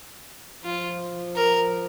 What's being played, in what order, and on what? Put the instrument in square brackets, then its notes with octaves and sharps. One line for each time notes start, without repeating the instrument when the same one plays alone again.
[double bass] F3 [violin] F4
[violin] A#4